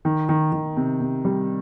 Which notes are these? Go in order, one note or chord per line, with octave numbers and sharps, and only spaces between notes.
D#3
D#3
D#3
C3
C3
G3